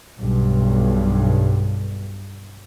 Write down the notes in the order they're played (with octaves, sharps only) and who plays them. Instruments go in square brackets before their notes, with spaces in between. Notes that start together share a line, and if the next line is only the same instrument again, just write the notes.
[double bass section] B1 G2